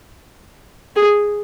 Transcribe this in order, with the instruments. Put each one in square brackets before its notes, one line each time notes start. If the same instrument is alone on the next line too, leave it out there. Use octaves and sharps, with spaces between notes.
[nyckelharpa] G#4